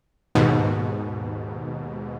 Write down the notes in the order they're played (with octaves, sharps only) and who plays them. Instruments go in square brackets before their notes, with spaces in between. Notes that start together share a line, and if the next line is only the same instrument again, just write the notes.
[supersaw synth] D#2 G#2 B2